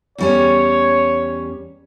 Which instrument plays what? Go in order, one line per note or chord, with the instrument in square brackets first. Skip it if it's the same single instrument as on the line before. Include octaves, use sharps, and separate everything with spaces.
[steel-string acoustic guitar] E2 G3 C#4 [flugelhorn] C#5